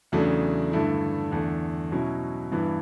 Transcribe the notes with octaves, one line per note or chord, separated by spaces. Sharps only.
E2 C#3 F#3 A3 D4
G2 D3 A3 E4
E2 D3 A3
B2 F#3 C#4 E4
G2 E3 B3 E4